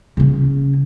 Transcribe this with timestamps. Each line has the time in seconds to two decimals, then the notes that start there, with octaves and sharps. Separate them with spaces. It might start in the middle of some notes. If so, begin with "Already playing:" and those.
0.17 C#3 C#4